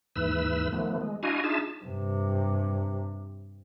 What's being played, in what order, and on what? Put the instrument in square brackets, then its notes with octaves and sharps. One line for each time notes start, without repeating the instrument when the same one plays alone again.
[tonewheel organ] D#2 G#2 E3 B4 E6
D#3 F3 A3 B3
G#3
D4 E4 F#4 D#5 F5 G#5
D4 D#4 F4 G#4 E5 A5
[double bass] G2 C3